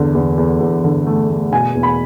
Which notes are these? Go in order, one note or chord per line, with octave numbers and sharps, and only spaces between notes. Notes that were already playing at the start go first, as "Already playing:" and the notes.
Already playing: E2 D3
E2
E2
E2
D3
A3
A3
B2 G#5
E2
B5